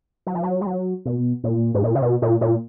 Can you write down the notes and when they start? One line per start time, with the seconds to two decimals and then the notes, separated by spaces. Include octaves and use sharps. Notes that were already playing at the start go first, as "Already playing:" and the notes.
0.27 F#3
0.35 F3
0.43 F#3
0.61 G#3
0.66 F#3
1.06 B2
1.44 A#2
1.74 G#2
1.84 A#2
1.95 C#3
2.02 B2
2.22 A#2
2.41 A#2